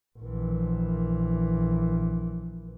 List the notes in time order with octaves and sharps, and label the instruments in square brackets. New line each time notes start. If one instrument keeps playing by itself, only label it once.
[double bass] A#1 E3